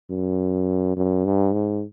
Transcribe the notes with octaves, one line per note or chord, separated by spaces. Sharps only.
F#2
F#2
G2
G#2